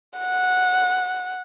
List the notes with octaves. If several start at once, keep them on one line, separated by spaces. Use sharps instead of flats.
F#5